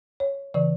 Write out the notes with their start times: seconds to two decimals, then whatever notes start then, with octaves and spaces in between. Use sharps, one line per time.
0.20 C#5
0.54 C#3 E3 D5